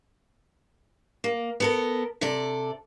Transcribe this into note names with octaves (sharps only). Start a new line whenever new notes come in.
A#3
B3 A4 A#4
C3 A4 D5